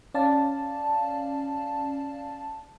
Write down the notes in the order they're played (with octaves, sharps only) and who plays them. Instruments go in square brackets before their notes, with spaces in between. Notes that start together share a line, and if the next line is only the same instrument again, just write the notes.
[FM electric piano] C#4 D5 F5 A5